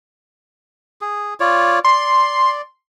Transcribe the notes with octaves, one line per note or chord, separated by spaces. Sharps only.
G#4
F4 C#5 D5
D5 C6